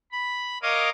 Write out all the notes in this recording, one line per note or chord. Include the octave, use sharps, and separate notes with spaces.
B5
A#4 C#5 D#5 F5 D6 D#6